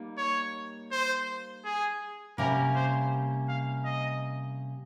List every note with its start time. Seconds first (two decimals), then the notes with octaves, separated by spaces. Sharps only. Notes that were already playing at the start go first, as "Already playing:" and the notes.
Already playing: G3 A#3 D#4
0.18 C#5
0.92 C5
1.65 G#4
2.38 C3 G3 A#3 C#4 A#4
2.75 C5
3.48 F5
3.85 D#5